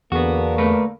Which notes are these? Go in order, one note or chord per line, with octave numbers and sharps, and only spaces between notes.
E2 D3 A#3 B3 F#4 G#4 C#6
A3 A#4 B4